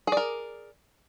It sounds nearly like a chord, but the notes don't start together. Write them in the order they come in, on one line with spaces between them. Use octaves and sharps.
G#4 D5 A#4